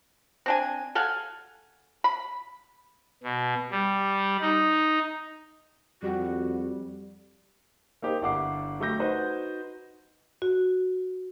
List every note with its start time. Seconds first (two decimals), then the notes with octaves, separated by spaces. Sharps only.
0.46 C4 D4 G#5
0.95 A4 F5 F#5 G#5
2.04 B5
3.23 B2
3.71 G3
4.41 D#4
6.03 F2 G3 F#4
8.02 A#3 D#4 G4 C5
8.22 G1 D4 E4 F#5 D6 C7
8.80 F#3 A3 G4 G6 A#6
8.99 D#4 F#4 B4 C5 F#5
10.42 F#4